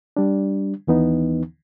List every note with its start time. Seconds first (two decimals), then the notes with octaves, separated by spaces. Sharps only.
0.17 G3 D4
0.87 D#2 E3 B3 D#4